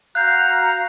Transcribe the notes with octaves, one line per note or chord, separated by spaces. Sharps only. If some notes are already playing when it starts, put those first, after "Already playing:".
F#4 F5 A#5 F#6 G6